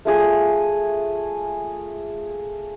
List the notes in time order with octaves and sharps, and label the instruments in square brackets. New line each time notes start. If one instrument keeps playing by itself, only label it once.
[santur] A3 F4 G#4